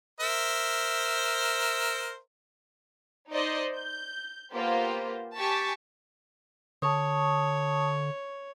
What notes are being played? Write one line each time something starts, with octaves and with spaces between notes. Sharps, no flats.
A#4 C5 E5
D#4 C5 D5 D#5
G6
A#3 B3 F4 G4 C5
G4 G#5 A5 C#6 A6 B6
D3 C#5 A5 C#6 D#6